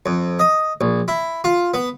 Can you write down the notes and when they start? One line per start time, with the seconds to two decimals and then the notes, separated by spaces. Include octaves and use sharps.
0.06 F2
0.39 D#5
0.81 A#1
1.08 E4
1.44 F4
1.74 B3